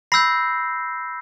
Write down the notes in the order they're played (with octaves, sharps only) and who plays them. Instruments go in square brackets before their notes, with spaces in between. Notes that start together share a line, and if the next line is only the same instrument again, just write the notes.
[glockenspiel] B5 E6 G6 A#6 C7